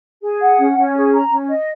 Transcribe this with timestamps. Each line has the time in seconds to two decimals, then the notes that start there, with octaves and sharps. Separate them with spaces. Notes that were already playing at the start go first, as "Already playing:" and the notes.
0.22 G#4
0.40 F#5
0.58 C#4
0.77 C#4
0.94 G#4
1.13 A#5
1.31 C#4
1.49 D#5